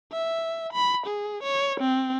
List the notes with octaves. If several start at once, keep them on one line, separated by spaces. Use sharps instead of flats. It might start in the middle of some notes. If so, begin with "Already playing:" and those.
E5
B5
G#4
C#5
C4